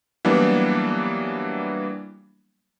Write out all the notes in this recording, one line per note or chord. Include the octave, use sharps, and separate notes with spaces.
E3 F#3 G3 A#3 B3 D4